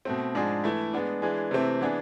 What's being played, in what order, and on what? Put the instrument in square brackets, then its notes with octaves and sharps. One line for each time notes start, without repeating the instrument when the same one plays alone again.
[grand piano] B2 A3 C4
G#2 F3 G#3 D4 G#4
E3 A3 E4
G#3 B3 D4
E3 G#3 D4 G#4
C3 E3 A3 C4
E3 B3 D4 G#4